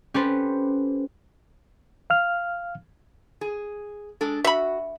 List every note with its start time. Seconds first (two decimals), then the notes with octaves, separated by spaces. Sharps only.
0.14 C#4 G4 A4 B4 C5
2.10 F5 F6
3.41 G#4
4.21 G#3 D4 A4
4.44 F#4 E5 B5